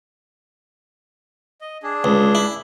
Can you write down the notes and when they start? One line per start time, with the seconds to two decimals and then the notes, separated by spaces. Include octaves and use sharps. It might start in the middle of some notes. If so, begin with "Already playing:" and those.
1.61 D#5
1.83 D4 G#4
2.04 C#2
2.35 E4